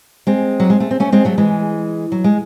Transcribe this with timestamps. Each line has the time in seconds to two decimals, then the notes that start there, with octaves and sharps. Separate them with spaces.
0.27 G#3 C4
0.60 F#3
0.70 G#3
0.80 A3
0.91 C4
1.00 A3 C#4
1.12 G#3 C4
1.25 F#3 A3
1.38 E3 G#3
2.12 F#3
2.24 G#3